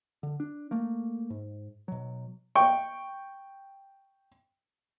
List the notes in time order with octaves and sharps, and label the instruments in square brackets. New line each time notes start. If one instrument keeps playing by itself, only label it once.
[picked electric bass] D3
D4
A3 A#3
G#2
B2 F#3
[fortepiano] G5 C#6